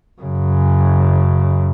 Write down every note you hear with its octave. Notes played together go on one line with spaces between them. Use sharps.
F#2 C#3